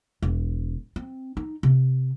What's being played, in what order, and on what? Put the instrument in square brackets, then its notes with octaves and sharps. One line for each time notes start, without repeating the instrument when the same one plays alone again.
[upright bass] E1
C4
D#4
C3